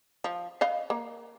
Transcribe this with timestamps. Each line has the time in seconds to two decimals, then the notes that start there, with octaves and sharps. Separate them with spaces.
0.24 F3
0.61 B4 D#5 F5
0.90 A#3